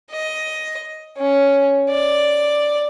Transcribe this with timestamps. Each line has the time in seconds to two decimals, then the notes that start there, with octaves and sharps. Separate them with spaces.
0.12 D#5
1.18 C#4
1.90 D5